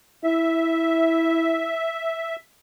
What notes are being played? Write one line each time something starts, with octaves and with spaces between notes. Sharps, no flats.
E4 E5